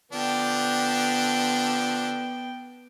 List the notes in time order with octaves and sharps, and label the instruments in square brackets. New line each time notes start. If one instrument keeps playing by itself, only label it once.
[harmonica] D3 F3 D4 [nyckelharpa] B3 G5